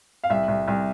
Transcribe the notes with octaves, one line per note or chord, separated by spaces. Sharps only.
F5
C2 E5
C2
C2